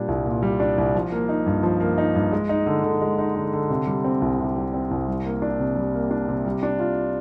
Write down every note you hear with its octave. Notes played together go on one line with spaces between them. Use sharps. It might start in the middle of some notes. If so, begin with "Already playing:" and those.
Already playing: A#2 G3 D4
C2
A#2
G3
D4
C2
F3
A#3
D#4
G2
F3
A#3
D#4
G2
G#3
D#4
D3
D3
G#3
D#4
D3
D3
C3
G3
C4
C2
C3
G3
C4
C2
G3
A#3
D4
C3
G3
A#3
D4
C3
G3
D4
F4